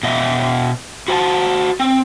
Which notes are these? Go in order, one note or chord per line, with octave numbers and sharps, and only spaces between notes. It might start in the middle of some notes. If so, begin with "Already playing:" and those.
B2 D#5 E5
F#4 C5 G#5 A5
C4